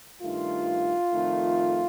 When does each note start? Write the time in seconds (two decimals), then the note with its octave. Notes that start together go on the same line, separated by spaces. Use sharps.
0.22 G2 D#3 A3 F4
1.12 F2 D#3 A3